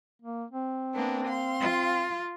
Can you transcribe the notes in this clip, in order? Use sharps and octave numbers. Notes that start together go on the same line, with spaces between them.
A#3
C4
A#3 B3 D4
F5 C6
F4